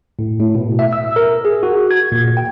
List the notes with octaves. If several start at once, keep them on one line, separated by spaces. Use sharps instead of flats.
A2
A2
B2
E5
E6
A#4
G#4
F#4
G#6
A#2
G5